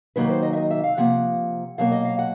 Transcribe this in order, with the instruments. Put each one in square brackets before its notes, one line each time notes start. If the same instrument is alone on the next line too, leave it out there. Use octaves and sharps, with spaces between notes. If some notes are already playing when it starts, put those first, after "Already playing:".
[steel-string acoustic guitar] D#3 F#3 A#3 D#4 B4
C5
D#5
E5
D#5
E5
F5
C3 F3 A#3 F#5
B2 F#3 A#3 F5
D#5
F5
F#5